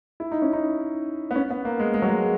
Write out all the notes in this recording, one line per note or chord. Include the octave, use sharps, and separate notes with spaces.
E4
D#4
C#4
D#4
B3
C#4
B3
A#3
G#3
G#3
F#3
G#3